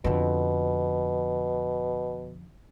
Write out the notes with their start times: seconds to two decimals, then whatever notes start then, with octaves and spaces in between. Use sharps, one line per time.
0.04 F2 B2 D3